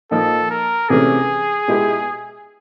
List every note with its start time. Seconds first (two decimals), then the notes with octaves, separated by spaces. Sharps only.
0.11 A#2 F3 A#3 D#4 A4
0.51 A#4
0.89 C3 E3 A3 C#4 G#4
1.68 B2 G#3 B3 E4 G4